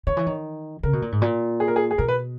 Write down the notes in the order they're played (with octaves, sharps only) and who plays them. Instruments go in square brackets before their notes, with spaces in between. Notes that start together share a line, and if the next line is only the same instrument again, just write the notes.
[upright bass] D#3 [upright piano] C#5
[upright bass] E3
D#3
[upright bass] C#3 [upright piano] A#4
[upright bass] B2
A#2
G#2
A#2
[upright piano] G#4
A#4
G#4
G#4
[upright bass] B2 [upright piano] A#4
[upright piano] B4